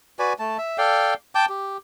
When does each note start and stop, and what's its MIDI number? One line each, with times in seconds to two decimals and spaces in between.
0.19 0.33 66
0.19 0.33 71
0.19 0.33 74
0.19 0.33 80
0.39 0.57 57
0.39 0.57 81
0.58 0.77 76
0.78 1.14 69
0.78 1.14 74
0.78 1.14 77
0.78 1.14 79
1.35 1.46 79
1.35 1.46 81
1.35 1.46 86
1.49 1.78 67